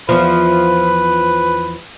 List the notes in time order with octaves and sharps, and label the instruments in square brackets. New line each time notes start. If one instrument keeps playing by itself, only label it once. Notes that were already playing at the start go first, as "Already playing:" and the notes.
[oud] E2 F3 [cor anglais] B4